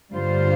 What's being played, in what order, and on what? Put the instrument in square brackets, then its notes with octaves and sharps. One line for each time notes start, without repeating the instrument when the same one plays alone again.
[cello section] G2 D3 G3 F4 C5